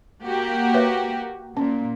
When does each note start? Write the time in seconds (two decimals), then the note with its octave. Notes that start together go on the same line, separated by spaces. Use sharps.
0.24 A#3 F#4 G4
0.74 B4 C#5 E5
1.57 A#2 C#4